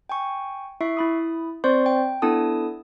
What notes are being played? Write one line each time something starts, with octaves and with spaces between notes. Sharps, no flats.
G5 G#5 C#6
E4 E5 C#6 C7
E4 B5 D#6
C4 C5 D5 C6 C#6
G5
B3 D4 E4 A4 A5 D#6